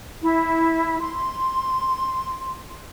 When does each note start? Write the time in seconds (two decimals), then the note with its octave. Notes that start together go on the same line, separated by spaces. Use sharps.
0.22 E4
1.00 C6